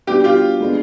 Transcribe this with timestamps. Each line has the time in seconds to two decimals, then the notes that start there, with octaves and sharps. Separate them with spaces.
0.07 G3 B3 D4 F#4 G4
0.24 F4 G4
0.60 G#3 B3 D4